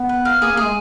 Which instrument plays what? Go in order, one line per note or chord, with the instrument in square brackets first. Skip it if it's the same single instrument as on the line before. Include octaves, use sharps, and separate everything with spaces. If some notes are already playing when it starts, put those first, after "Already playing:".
Already playing: [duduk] B3
[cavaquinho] B4
F5
[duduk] A#3 [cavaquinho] G#4
[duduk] A#3
[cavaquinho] G#4
[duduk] G#3